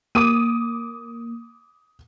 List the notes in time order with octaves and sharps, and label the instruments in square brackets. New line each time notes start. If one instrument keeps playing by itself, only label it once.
[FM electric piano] A#3 [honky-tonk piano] D6 D#6 D#7